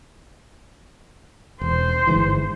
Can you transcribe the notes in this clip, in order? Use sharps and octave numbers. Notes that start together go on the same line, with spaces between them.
E1 C5
G1 G#2 E3